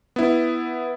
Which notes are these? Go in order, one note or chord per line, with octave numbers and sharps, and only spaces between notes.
B3 E4